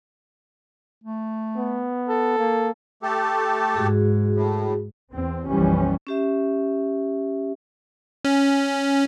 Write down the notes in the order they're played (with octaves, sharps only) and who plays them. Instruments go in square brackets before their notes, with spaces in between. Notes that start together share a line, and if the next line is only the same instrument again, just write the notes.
[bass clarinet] A3
[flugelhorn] B3
[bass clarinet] A4
[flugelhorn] A#3
[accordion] A3 G4 A4
[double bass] G#2 [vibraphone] F#4 G#4
[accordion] A2
[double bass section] E2 C4
F#1 B1 E3 F3 G3 C#4
[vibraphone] C#4 G4 E5
[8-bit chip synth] C#4